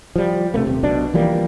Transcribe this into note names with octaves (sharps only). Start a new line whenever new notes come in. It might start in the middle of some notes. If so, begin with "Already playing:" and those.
F3 G3
G2 C3 A3 A#3
D#1 C3
B1 B2 D4
E3 F3 G3 A#3